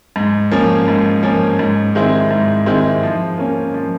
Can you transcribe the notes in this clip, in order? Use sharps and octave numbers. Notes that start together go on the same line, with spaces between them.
G#2
F3 A#3 C#4
G#2
F3 A#3 C#4
G#2
D#3 G#3 C4 E4
G#2
D#3 G#3 C4 E4
F3
A#3 C#4
F3